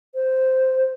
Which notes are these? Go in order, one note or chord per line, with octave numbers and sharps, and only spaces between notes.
C5